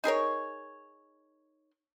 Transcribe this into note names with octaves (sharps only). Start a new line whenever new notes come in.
D#4 G#4 A#4 C#5